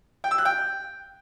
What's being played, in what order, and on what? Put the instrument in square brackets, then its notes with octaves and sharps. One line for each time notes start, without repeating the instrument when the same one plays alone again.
[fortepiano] G5
E6
F#6
G5